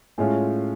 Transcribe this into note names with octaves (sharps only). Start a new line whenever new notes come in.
A2 G#3 C#4 F4